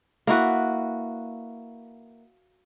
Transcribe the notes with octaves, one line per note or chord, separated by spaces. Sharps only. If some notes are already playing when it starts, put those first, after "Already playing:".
A#3 E4 F#4 B4